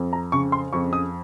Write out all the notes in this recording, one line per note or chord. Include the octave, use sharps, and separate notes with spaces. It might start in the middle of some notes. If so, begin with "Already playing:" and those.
Already playing: F2
A#5
C#3 C#6
C6
F2 C#6
D#6